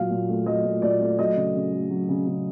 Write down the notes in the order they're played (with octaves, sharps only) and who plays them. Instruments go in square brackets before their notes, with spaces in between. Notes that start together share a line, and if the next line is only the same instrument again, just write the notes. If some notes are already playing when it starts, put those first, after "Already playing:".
Already playing: [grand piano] A#2 F#3 F5
A#2
A3
F#3 D#5
A#2
A#2 D5
A3
F#3 D#5
C#3
C#3
A3
F#3
C#3
C#3